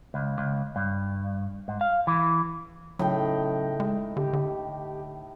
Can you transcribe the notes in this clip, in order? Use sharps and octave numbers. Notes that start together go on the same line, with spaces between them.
C#2
C#2
G2
G#2
F5
E3
A2 C#3 F#3 D#4 G5
G#3
D3 G4
D3